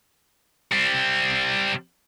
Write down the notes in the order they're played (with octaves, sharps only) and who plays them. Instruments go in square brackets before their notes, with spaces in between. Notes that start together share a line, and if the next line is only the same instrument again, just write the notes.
[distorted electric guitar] G3 C4